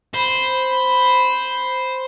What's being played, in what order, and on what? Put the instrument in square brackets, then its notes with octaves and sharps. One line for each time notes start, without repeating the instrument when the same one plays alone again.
[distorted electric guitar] C5 [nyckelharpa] B5